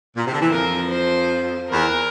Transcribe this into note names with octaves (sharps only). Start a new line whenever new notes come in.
A#2
C3
D3
E3
F2 F3 A#4
C5
E2 E3 A#4